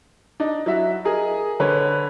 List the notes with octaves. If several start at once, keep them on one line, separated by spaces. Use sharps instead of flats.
D4 D#4
F#3 E4 F#4 E5
G#4 A#4 D#5
D3 B4 C#5